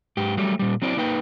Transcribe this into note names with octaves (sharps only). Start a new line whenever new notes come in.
G#2 G4
F#3 G3 A3
A#2 G3
F#3 C4 E4 D5
A#3 D#4 B4 G5